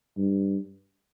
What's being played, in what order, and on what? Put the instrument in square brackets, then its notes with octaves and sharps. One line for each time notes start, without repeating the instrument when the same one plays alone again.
[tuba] G2